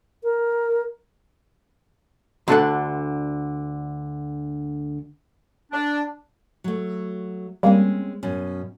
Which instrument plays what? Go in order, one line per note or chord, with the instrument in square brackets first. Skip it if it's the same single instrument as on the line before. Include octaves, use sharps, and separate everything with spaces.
[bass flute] A#4
[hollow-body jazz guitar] D2 D3 D4 A4 D5 F#5
[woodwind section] D4
[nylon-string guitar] F#3 A3
[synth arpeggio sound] G3 A#3 [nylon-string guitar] G#3 C4 C#4
[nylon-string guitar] F#2 B2 C#4